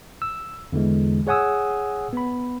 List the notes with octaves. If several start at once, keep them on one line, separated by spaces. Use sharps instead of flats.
E6
E2 D3 E3 G#3
G#4 C#5 F#5 G#5 D#6 E6
B3 B5